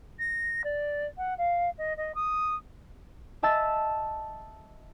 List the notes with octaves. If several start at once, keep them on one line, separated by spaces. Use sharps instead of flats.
A#6
D5
F#5
F5
D#5
D#5
D#6
D#5 E5 A5 E6 A6